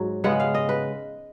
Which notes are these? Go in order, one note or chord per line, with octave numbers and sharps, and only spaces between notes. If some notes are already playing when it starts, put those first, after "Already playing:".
Already playing: G#2 F#3
C#3 G#3 B3 F#5
F5
D#5
B4